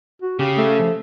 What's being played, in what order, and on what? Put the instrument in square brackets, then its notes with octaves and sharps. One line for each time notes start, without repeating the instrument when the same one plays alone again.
[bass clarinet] F#4
[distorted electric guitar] C#3 [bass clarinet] G4
[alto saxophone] A3
[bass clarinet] F3